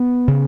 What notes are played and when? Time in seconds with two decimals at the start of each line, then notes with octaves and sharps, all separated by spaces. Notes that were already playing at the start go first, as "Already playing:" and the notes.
Already playing: B3
0.28 C#3